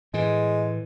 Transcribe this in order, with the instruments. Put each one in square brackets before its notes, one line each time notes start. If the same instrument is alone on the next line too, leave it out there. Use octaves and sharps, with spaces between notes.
[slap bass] A2 E3 [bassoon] G#3